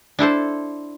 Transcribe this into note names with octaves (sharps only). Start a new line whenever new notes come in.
D4 E4 A4 C5